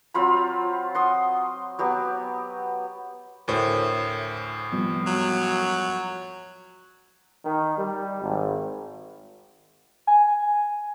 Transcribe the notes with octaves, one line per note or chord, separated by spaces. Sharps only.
F#3 C4 F4 B5
F#5 C6 D#6
F#3 B3 G4
D2 A2 A#4 C5 C#5
F3 G3 B3
F#3
D#3
G3
G#1
G#5